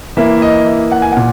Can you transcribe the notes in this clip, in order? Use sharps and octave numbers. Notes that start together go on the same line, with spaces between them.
E3 A#3 E4 E5
D#5
E5
F#5
G#5
A#2 F#5